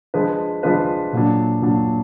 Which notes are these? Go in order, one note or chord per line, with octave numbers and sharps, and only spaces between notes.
F3 G#3 D4 F4 B4
F3 G#3 D4 F4 B4
A#2 F#3 D4
A#2 F#3 D4